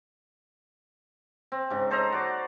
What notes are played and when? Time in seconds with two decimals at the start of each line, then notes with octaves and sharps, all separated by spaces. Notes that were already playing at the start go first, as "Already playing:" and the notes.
1.52 C4
1.70 G#2 C#3
1.90 A4 C5 D#5 A#5
2.12 F#4 D5